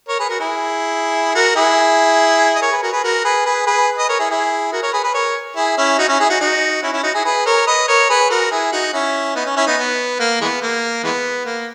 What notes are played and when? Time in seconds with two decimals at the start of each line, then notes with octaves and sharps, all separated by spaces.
0.08 A#4 C#5
0.19 G#4 B4
0.29 F#4 A#4
0.40 E4 G#4
1.35 F#4 A#4
1.56 E4 G#4
2.56 D#5
2.61 A#4 C#5
2.72 G#4 B4
2.83 F#4 A#4
2.93 G#4 B4
3.03 F#4 A#4
3.24 G#4 B4
3.45 G#4 B4
3.66 G#4 B4
3.98 B4 D#5
4.08 A#4 C#5
4.19 E4 G#4
4.30 E4 G#4
4.72 F#4 A#4
4.82 A#4 C#5
4.93 G#4 B4
5.03 G#4 B4
5.14 A#4 C#5
5.56 E4 G#4
5.77 C#4 E4
5.98 D#4 F#4
6.09 C#4 E4
6.20 E4 G#4
6.30 D#4 F#4
6.41 D#4 F#4
6.83 C#4 E4
6.93 C#4 E4
7.03 D#4 F#4
7.14 E4 G#4
7.25 G#4 B4
7.46 A#4 C#5
7.67 B4 D#5
7.88 A#4 C#5
8.09 G#4 B4
8.30 F#4 A#4
8.51 E4 G#4
8.72 D#4 F#4
8.93 C#4 E4
9.35 B3 D#4
9.46 C#4
9.56 C#4 E4
9.66 B3 D#4
9.77 B3
10.19 A#3
10.41 E3 G#3 B3
10.62 A#3
11.04 E3 G#3 B3
11.45 A#3